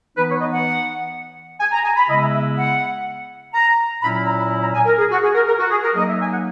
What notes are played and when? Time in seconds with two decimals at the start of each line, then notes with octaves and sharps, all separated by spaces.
0.15 E3 B3 D#4 B4
0.27 C#5
0.39 D#5
0.51 F#5
1.60 G#5
1.72 A#5
1.84 G#5
1.97 B5
2.08 C#3 G#3 B3 E4 D#5
2.21 E5
2.33 E5
2.57 F#5
3.53 A#5
4.02 A#2 F#3 C#4 E4 B5
4.13 A#5
4.25 A#5
4.38 B5
4.50 A#5
4.62 A#5
4.74 G#5
4.86 A#4
4.98 G#4
5.11 F#4
5.23 G#4
5.34 A#4
5.47 A#4
5.59 F#4
5.70 G#4
5.83 A#4
5.95 F#3 A#3 D#4 D#5
6.07 E5
6.20 G#5
6.31 F#5